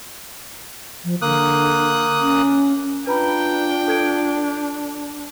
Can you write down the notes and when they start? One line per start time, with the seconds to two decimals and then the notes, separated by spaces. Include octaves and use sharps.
1.04 F3
1.22 D3 A#3 D#6 F#6
2.21 C#4
3.07 D4 F4 B4 G5 A#5 B5
3.88 A4 G#6 D7